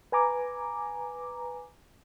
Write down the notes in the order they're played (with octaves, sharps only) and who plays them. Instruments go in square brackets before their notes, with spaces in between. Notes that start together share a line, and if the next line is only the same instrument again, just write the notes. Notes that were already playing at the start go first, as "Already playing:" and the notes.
[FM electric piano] B4 G#5 A#5 D6